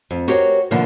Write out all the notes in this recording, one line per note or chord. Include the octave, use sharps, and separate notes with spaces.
F2
F#4 G4 A#4 C5 C#5 D#5
B2 D3 E3 F3 A#3